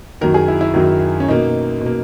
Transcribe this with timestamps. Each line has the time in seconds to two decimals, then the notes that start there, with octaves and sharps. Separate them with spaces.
0.21 F#2 D#3 F#3 A#4
0.34 G#4
0.48 E4
0.61 E4
0.74 F#2 D#3 F#3
1.20 C#4
1.28 B2 A#3 D#4
1.81 B2
1.86 A#3